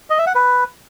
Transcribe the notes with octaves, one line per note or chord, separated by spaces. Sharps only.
D#5
E5
F#5
B4